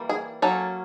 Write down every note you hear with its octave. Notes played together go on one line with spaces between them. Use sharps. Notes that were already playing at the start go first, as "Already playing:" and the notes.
Already playing: E3 G3 A#3
G#4
F#3 A#3 C#4 A4